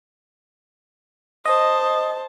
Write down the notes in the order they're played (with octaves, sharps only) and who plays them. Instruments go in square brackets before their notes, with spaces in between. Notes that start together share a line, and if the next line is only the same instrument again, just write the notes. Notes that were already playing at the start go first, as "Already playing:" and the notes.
[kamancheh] C5 A5 [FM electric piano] D#5 [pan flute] D#6